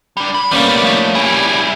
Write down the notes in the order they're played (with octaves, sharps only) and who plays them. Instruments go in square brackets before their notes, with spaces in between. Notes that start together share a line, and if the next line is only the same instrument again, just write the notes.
[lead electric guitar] G3 D4
B5
[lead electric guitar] C#2 B3 [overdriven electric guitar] D#3 G3 [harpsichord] A#3 C#4 D5
[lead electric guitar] F3 A3
[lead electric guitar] G3 E4 [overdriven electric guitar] G4 G#4